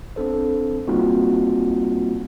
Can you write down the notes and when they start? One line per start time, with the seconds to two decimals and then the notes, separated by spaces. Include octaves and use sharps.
0.16 C4 D4 A4 C5
0.88 G3 A#3 C4 D#4 F4 F#4